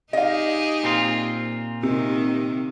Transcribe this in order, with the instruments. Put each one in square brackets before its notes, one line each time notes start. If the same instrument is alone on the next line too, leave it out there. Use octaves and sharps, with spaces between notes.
[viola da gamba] D#4 G4 G#4 [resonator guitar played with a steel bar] D#5 F5
[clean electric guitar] A#2 C4 F4
[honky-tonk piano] C3 [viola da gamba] D#3